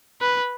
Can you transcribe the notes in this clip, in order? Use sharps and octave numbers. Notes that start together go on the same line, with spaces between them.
B4